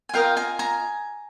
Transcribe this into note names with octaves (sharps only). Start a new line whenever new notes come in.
G#5
F4 A#4 D#5 F5 G5
G#5 A#5
G#5 A#5